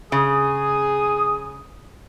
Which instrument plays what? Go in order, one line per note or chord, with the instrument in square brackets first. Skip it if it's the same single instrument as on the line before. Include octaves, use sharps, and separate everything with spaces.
[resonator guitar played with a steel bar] C#3 [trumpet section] G#4 D#6